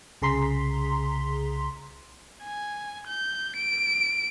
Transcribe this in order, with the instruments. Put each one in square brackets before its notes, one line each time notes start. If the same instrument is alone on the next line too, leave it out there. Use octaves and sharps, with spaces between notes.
[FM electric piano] C2 C#3 G#4 A#5 C6 B6
[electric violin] G#5
G6
D7